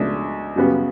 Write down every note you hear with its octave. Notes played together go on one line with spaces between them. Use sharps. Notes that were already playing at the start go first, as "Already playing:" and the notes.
Already playing: C#2 B2 A3 D4
F#2 C#3 G3 B3